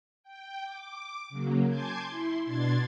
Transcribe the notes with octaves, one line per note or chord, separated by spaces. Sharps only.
G5
D6
C#3 F#3 A#3
G#5 A5 C6 D6 G6 G#6
E4 C6
B2 D4 C6 G#6 A6